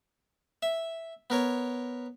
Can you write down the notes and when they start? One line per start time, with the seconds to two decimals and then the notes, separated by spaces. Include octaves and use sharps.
0.63 E5
1.30 B3 A#4 C#5